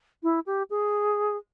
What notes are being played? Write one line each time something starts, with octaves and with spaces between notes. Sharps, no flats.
E4
G4
G#4